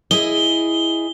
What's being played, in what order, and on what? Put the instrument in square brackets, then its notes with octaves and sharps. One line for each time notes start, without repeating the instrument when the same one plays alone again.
[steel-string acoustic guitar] E4 G#4 D#5 [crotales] G7